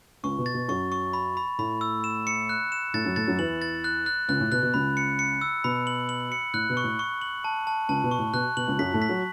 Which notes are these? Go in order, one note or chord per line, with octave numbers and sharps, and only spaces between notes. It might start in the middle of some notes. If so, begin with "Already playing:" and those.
C#2 C#3 C#6
B2
A6
B2
F#2 F#3 C#6
C#6
B5
B5
A2 A3 B5
E6
E7
C#7
F#6
E7
A2 A3 A6
F#2 F#3
A2 A3 A6
F#2 F#3
E2 E3 F#7
A6
F#6
F#6
C#2 C#3 F#6
A2
B2 F#6
B2
C#2 C#3 B5
C#7
C#7
E6
B2 B5
F#7
F#7
C#7
A2 F#6
B2
C#6
A2
C#6
F#7
A5
A5
C#2 C#3 A5
B2
C#6
A2
B2 F#6
B2 F#7
C#2 C#3
F#2 F#3 B6
A2 A3
B6
F#3